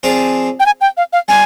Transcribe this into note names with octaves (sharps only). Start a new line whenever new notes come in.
F3 C4 F4 G#4 D5
G5
G#5
G5
F5
F5
G3 D4 F4 G#5